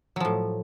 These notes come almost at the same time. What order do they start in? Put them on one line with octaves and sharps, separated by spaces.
F#3 F3 A2